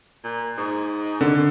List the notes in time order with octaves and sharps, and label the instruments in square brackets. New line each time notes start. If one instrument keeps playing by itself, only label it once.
[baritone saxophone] A#2
G#2
[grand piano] D3